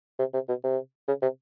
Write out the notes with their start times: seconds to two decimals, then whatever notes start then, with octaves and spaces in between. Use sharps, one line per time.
0.19 C3
0.34 C3
0.48 B2
0.64 C3
1.08 C#3
1.22 C3